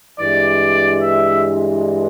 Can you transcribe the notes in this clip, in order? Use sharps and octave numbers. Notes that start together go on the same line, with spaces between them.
G2 E3 G#3 D5
E5